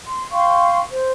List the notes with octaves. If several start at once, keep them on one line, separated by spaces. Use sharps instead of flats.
C6
F5 G5 C6 C#6
C5